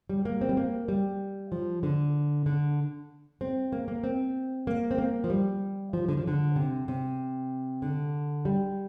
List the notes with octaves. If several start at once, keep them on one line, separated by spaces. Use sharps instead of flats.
G3
A#3
C4
G3
A#3
G3
F3
D3
D3
C4
A#3
A#3
C4
A#3
C4
A#3
F3
G3
F3
D3
F3
D3
C3
C3
D3
G3